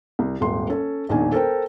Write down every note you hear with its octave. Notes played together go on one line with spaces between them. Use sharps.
C2
D#1 G#1 C6
C#4 A4
E1 A#1 A#2 D#3 D4 G#5
A4 A#4 C5 G5